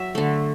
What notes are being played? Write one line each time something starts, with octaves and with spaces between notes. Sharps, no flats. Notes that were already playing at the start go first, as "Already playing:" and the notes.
Already playing: F#3 E5
D3 A3